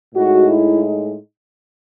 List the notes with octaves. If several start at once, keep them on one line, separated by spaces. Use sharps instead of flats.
A2 G#3 D#4 F#4
E4